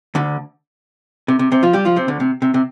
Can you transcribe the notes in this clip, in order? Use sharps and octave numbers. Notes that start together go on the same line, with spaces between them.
D2 D3
C3
C3
C3 C4
F3 F4
G3 G4
F3 F4
C3 C4
D2 D3
C3
C3
C3